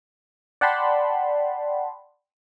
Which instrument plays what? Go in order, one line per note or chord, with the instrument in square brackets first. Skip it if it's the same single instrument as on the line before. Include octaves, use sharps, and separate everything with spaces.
[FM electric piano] D5 F#5 G5 A5 B5 C6